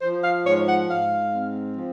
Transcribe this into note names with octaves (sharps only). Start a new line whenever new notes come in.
F3 C5
F5
G#2 C#5
F#5
G#2 F5
C4
F3